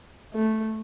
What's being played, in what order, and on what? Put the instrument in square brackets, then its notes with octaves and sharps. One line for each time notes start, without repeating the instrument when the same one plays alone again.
[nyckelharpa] A3